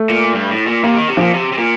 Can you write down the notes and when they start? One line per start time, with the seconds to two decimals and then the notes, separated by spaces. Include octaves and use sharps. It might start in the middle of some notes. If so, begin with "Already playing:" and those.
Already playing: A3
0.09 A#2
0.34 G2
0.51 A2
0.67 A#2
0.83 C3 A#3
0.96 D#3
1.09 C3
1.17 A#2 F3
1.34 C3
1.52 C3
1.58 A#2